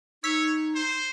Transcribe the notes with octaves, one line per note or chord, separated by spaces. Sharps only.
D#4 C#5 E6 B6
C5